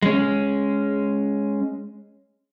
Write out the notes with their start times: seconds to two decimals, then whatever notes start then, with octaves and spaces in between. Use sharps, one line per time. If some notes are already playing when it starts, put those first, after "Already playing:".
0.03 G#3 C#4